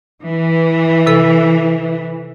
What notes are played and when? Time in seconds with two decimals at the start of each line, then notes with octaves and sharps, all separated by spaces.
0.24 E3
1.07 C3 A4